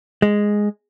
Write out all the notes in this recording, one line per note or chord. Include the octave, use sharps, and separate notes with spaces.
G#3